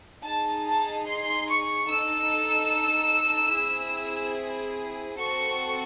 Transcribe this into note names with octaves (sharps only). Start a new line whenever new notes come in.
D#4 G#4 A5
A5
C6
C#6
D#4 A4 E6
C4 E4 G#4
C4 F#4 A4 C#6